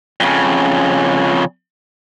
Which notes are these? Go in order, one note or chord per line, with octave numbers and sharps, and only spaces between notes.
F2 C#3